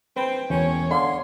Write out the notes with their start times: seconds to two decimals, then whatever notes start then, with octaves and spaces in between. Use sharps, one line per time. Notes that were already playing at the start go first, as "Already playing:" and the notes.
0.16 C4 B4 C5 G5
0.50 E1 C#4 C#5
0.91 D3 F5 C6